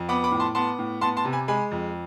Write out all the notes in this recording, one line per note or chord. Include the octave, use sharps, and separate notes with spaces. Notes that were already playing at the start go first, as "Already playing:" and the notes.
Already playing: F2
B3 B5 D6
B5 D6
A2
A5 C6
B3 A5 C6
A2
B3 A5 C6
A5 C6
C3
G#5 B5
G#3 G#5 B5
F2